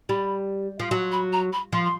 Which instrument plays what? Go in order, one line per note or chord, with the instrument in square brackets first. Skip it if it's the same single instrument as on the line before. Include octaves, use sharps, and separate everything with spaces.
[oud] G3 [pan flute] B5
[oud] F3
F#3
[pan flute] B5
A#5
B5
[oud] F3 [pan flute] C6
[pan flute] C6